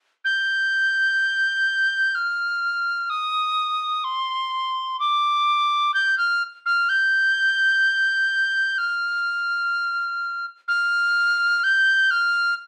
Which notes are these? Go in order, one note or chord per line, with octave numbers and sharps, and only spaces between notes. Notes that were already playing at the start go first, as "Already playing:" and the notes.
G6
F6
D#6
C6
D6
G6
F6
F6
G6
F6
F6
G6
F6